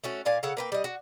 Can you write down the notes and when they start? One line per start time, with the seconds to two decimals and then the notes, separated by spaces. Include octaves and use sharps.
0.04 A3 C#4 F#4
0.25 A#2 D5 F5 G#5
0.43 C#3 A4 F5 F#5
0.57 A#3 B4 G5
0.72 G3 D#5
0.84 F#4